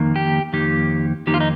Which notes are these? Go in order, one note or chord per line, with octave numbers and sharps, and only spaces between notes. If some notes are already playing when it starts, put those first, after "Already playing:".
Already playing: F2 D#3 A#3 D#4
G4
F2 D#3 A#3 D#4 G4
F2 D#3 A#3 D#4 G4
F4
D#4